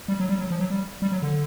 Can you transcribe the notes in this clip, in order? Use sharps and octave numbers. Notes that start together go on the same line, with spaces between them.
G3
F#3
G3
F#3
F3
F#3
G3
G3
F#3
D3